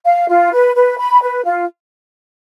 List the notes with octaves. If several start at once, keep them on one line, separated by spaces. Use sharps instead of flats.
F5
F4
B4
B4
B5
B4
F4